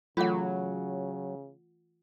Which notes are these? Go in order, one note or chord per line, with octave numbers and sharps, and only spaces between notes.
C#3 E3 F#3 A3 F4 A4 F#5